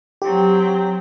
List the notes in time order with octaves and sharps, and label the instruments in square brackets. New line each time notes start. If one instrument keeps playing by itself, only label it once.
[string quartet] F#3 C4 [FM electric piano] G4